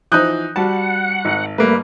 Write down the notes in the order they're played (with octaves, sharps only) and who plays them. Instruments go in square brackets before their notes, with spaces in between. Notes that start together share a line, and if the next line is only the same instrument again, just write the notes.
[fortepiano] E3 F3 D#4 [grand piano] D#6 F#6 G6
[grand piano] G3 F#4 [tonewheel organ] F#5 [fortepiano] A5
[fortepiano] G#1
[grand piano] G3 A#3 B4 [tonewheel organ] A3